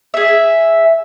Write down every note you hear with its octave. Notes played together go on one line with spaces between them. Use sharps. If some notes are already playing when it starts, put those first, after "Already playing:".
G#4 E5